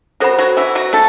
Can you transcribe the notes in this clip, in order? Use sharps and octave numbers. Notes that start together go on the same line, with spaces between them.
F#3 F#4 A4 C5 F#5 B5
F#3 F#4
E3 E4
F#3 F#4
A3 E4 A4